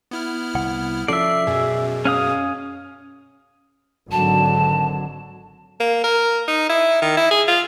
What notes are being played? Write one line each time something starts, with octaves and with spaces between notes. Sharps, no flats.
B3 E4 F6
C2 F#5
F3 C#4 A4 D5 E5 C7
F#2 B2 G#4
C#4 F5 D#6
G#1 D3 F#3 A5
A#3
A#4
D#4
E4
D#3
E4
G#4
F4